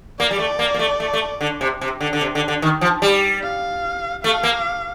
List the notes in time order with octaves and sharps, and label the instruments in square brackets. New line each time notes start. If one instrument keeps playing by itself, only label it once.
[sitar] A#3 [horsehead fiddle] D5
[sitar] G3
A3
A#3
A#3
A3
A3
A3
D3
C3
C3
D3
D3
C3
D3
D3
D#3
F3
G3
[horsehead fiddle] F5
[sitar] A3 [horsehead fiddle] F5
[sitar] A#3